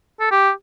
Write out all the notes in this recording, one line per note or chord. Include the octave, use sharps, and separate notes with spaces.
A4
G4